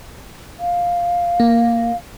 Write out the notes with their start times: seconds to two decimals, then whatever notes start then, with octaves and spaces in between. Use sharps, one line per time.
0.59 F5
1.40 A#3